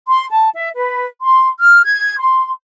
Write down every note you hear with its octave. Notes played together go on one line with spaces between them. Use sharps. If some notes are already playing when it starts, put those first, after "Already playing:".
C6
A5
E5
B4
C6
F6
G#6
C6